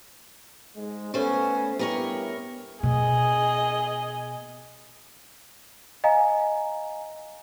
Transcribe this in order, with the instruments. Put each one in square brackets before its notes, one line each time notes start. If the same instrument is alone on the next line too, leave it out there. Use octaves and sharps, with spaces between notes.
[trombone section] G#2 G#3
[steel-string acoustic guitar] A3 C5 [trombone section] B3 C#4
[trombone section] G2 E4 G4 [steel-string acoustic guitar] B3 A#4 C#5
[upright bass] B2 [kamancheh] G#4 D#5
[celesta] D#5 F5 G#5 A#5